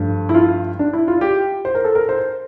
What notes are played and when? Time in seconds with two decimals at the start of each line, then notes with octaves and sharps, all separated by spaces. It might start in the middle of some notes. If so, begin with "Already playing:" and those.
Already playing: G2 F3 A3
0.29 E4
0.34 F4
0.79 D4
0.93 E4
1.08 F4
1.21 G4
1.65 C5
1.75 A#4
1.85 A4
1.95 A#4
2.09 C5